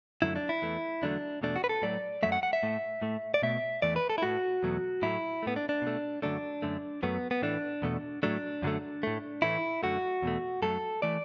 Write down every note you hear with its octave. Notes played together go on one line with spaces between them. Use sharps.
F#2 D3 F#3 A3 E4
D4
E4
E2 E3 A3
E2 D3 F#3 A3 D4
E2 B2 A3 D4
F#4
B4
A4
A2 F#3 A3 D5
F#2 F#3 A3 E5
F#5
F#5
E5
A2 A3
A2 A3
D5
B2 A3 E5
E2 E3 A3 D5
B4
A4
E4
A2 A3 F#4
E2 B2 F#3 A3
A2 F#3 A3 E4
A2 A3 B3
D4
D4
B2 A3
F#2 D3 F#3 A3 D4
F#2 D3 A3
F#2 F#3 A3 B3
B3
A2 E3 A3 D4
E2 B2 A3
A2 F#3 A3 D4
F#2 D3 F#3 A3
A2 A3
A2 E3 A3 E4
F#2 D3 A3 F#4
E2 B2 A3
F#2 F#3 A3 A4
E3 A3 D5